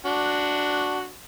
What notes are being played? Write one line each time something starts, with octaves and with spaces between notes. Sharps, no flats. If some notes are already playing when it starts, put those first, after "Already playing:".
D4 F#4